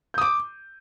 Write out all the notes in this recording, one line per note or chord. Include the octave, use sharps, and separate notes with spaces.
D6 D#6 G6